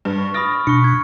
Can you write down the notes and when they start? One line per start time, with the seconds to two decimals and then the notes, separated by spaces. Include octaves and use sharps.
0.05 G2 B4
0.18 C#6
0.34 B5 D#6 F6 A6 A#6 D7
0.67 B2 D4 C#6 C#7
0.84 B5 G#6